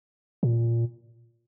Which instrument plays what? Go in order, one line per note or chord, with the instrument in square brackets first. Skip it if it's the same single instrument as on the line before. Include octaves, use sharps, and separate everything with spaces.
[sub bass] A#2